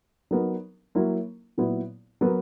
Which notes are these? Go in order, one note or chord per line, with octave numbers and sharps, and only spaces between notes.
F#3 B3 D#4 A#4
F#3 A#3 E4 A#4
A#2 F#3 B3 E4
F#3 B3 F#4 A#4